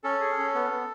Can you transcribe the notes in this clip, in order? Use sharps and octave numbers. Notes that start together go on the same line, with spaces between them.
C#4 A4
G#4
C#4
B3
B3